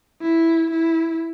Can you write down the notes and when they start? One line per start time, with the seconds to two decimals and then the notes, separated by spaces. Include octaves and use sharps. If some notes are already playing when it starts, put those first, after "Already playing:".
0.22 E4
0.71 E4